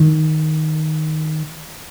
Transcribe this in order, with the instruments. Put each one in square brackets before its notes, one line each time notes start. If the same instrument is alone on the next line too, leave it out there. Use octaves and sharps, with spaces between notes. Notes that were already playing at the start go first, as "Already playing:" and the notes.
Already playing: [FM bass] D#3